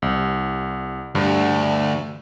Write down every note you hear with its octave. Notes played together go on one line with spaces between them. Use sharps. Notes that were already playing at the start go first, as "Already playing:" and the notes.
C2
D2 G2